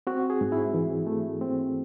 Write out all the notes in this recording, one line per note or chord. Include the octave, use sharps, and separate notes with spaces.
C4 F#4
G#4
G#2
E4
E3
A3
C4